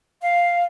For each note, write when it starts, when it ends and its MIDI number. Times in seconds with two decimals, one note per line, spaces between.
0.22 0.64 77